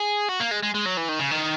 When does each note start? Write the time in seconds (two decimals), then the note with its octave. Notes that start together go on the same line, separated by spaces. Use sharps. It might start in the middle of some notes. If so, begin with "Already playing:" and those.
Already playing: G#4
0.29 F#4
0.40 A#3
0.51 G#3
0.63 G#3
0.75 G#3
0.86 F#3
0.97 E3
1.09 D#3
1.19 C#3
1.31 D#3